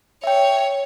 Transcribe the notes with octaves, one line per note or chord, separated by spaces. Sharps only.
C#5 E5 G5